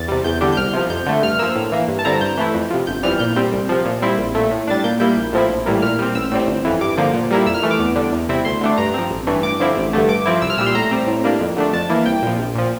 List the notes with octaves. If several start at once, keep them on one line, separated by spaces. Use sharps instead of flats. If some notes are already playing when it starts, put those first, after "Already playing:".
Already playing: E2 A6
C3 G3
E2 G6
D3 G3 D4
G6
C2 F6
C3 F3
F2 G6
D3 A3
G2 F6
F3 A#3 E6
A2
E3 A#3
G2
A5
D3 G3 C4 E4 A#5
G2 G6
E3 A3 E4
F2
C3 F3
G1 G6
F2 E3 G3 F6
A#2 G6
G3 C4
C2
C3 F3
A#2
G3 C4 E4
A#1
A#2 A3
A2
G3 D4 A6
A#2 G6
G3 A#3 E4 G6
A#1
A2 F3 C4 E4
A#1
A2 E3 G3 A#3
A#2 F6
G3 C4
A1 E6
A2 G3 C4
G1
F2 E3
G2 D6
D3 F3 A#3
A#2
G3 A#3 E4
F2 E6
F6
E3 A3
D6
E2
D3 G3 D4
E2
C3 G3 C4 E4
D2 C6
D3 A3 D4
G2 A#5
F3 C4
A1
G2 E3 A3
G2 D6
D3 F3 C4 E4
A1
G2 D3 A3
G2 D6
F3 C4 E4
C2 E6
F6
A#2 G3 E6
C6
A2 A#5
G3 C4
A2
G3 A#3 D4
F2
D3 A3 D4
F2 A5
E3 A#3 E4
C2 G5
A#2 F3
A#1
A#2 F3